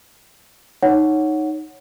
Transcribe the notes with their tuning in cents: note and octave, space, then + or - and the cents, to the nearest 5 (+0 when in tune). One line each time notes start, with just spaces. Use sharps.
D#4 +0 C#5 +0 F#5 +0